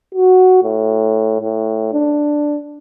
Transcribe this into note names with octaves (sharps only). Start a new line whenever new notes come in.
F#4
A2
A2
D4